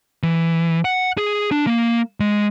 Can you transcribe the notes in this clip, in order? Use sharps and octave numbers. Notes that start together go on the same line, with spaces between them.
E3
F#5
G#4
D4
A#3
G#3